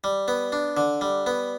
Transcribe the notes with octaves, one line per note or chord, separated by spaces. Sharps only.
G3
B3
D4
D3
G3
B3